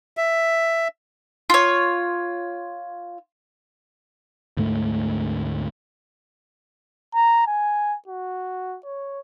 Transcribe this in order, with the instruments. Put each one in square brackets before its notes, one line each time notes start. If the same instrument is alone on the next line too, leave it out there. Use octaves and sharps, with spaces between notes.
[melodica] E5
[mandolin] F4 C#5
[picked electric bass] D2 G#2 A3
[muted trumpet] A#5
G#5
F#4
C#5